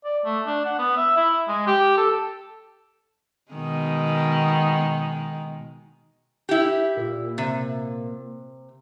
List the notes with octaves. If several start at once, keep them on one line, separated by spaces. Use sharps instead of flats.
D5
A3
D4
F#5
B3
E5
E4
G#3
G4
A4
B2 D#3 G#3
E4 G4
A#2
C3